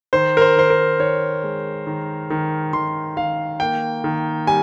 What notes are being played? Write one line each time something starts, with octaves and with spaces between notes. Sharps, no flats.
D#3 C5
A#4
C5
D#3 C5
A#4
D#3 C#5
G#3
D#3
D#3
D#3 C6
D#3 F5
A#3 G5
D#3
G3 G#5